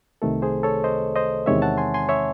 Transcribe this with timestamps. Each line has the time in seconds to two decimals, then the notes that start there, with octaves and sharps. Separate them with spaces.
0.22 C2 C3 D#3 A3 A4
0.42 G#4 C5
0.63 A4 C#5
0.84 C5 D#5
1.16 C5 D#5
1.46 E2 C3 D#3 G#3 C4 C#5 E5
1.62 F#5 A5
1.78 G#5 C6
1.94 G#5 C6
2.09 C#5 E5